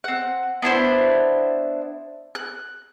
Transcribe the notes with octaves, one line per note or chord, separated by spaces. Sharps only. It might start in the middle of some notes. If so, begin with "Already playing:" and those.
C4 F#5
B3 D4 E4 C5
F#6